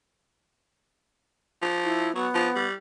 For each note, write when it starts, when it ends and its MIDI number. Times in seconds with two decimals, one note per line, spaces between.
1.62 2.08 53
1.84 2.15 64
2.15 2.28 54
2.15 2.65 59
2.34 2.49 53
2.56 2.73 55